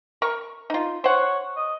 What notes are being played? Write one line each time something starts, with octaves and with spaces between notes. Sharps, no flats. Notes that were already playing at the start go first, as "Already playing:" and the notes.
A#4 C#6
D#4 F4
C5 C#5 F#5
D#5